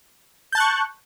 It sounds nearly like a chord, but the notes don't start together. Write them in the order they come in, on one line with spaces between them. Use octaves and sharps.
G6 A5 F#6 C#6